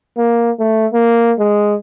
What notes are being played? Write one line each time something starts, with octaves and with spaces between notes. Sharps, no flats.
A#3
A3
A#3
G#3